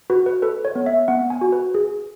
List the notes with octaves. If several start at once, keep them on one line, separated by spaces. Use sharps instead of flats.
F#4 B4
B4
A4 B4
C#5
B3
E5
B3 F#5
G#5
F#4
B4
G#4